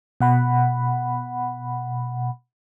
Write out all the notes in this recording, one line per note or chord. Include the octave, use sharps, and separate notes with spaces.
B2 F#5 B5